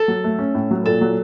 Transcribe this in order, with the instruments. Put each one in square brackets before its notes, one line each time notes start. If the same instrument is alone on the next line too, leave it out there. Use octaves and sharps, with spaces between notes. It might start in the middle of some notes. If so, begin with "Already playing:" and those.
Already playing: [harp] A4
[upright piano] F#3
A3
C#4
A2
F#3
[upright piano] A#2 [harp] A4
[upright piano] F#3